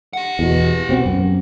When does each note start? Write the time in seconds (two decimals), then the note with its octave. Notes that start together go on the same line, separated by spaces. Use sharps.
0.13 G4 F#5
0.39 E2 B2
0.89 B2 C4
1.06 F#2